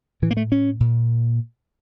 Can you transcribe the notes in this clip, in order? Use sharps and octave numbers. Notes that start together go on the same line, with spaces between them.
A2 E3
A#3
A3
C#4
A#2